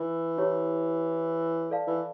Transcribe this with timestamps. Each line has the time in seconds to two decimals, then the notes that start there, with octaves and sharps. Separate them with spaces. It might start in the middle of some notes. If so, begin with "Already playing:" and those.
Already playing: E3
0.38 E4 G4 C#5
1.70 A4 D5 F5 A5
1.87 E3